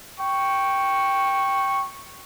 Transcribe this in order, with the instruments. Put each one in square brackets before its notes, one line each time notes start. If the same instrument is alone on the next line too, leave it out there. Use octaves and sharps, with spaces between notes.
[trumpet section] G5 C#6